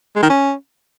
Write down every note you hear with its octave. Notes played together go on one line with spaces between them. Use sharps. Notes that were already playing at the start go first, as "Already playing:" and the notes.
G#3
D#3
C#4